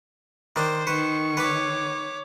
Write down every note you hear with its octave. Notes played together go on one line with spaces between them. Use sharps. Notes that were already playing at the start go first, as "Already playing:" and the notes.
D#3 D4 C5
D#3 B4 C#6
B4 C#5 B5 D6